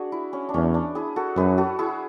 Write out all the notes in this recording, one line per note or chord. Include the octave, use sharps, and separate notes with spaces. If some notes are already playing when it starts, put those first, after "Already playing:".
Already playing: D4 F#4 G#4
E4
C#4
D4
E2 C#4
D4
E4 G#4
F#4 A4
F#2 G#4 B4
F#4 A4
E4 G#4